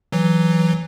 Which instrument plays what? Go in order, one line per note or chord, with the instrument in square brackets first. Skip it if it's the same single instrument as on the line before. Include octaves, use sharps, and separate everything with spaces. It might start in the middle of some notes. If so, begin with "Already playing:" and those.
[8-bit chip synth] E3 F#3